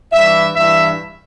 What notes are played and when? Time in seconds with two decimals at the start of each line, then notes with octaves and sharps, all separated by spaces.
0.12 G2 E3 E5
0.54 G2 E3 E5